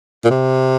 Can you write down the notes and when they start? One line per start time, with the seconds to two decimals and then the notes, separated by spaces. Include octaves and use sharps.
0.25 A#2
0.30 C3